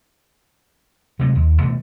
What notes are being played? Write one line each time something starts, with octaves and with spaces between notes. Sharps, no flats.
C3 F#3 G#3 A3
D#2
B2 E3 A3 B3